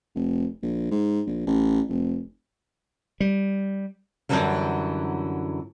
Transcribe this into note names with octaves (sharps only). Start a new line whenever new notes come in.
F1
A#1
G#2
A#1
A1
F1
G3
F#2 A#2 D3 E3 F#3 G3